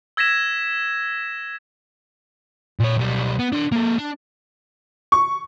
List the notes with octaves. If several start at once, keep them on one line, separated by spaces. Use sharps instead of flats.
E6 G#6 A#6 B6 E7
A#2 C#5
B1 G3
B3
D4 C6
A#3 A4
D4
C#6